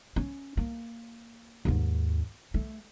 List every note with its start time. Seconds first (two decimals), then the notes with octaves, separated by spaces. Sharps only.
0.16 C#4
0.57 A#3
1.65 D#2 G#2
2.54 A3